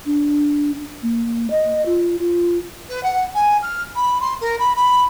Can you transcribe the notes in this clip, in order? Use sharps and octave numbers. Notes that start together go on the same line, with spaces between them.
D4
A#3
D#5
F4
F4
B4
F#5
G#5
F6
B5
C6
A#4
B5
B5